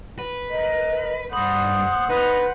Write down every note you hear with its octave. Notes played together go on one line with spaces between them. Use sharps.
B4
A#4 D#5
G2 C5 F#5 B5 D#6
D#4 B4